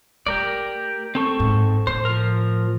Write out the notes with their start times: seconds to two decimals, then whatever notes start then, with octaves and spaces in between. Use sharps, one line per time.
0.27 A3 G4 A#4 D5
1.15 C4 A4 C#6
1.40 G#2
1.87 A2 C5
2.05 F3 A#4